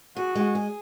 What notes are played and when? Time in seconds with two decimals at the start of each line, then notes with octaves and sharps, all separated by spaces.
0.16 F#4 G#4
0.35 G#3
0.55 G#4